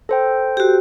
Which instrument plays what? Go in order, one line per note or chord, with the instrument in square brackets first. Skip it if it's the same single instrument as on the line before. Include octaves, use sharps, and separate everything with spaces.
[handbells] A4 C5 G5
[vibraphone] F#4 G4